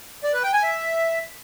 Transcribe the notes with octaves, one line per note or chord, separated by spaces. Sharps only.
D5
B4
G5
G#5
E5